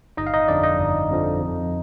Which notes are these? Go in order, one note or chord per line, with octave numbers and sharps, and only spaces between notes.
G1 D#4 D#5
F5
D#4 D#5
F2 D3 F3 D4 D5
D#4 D#5
G1
F2 D3 F3
F2